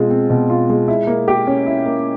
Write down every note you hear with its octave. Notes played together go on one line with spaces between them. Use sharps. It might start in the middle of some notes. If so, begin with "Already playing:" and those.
Already playing: B2 G#3 C4 F4
C4
B2
F4
G#3
E4
A#3
G4
C#4
E4
A#3